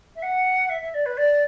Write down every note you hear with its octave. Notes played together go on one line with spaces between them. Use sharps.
E5
F#5
E5
E5
D5
B4
D5